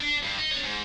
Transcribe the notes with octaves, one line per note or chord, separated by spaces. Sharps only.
D4
G2
D#4
D4 C#5
G#2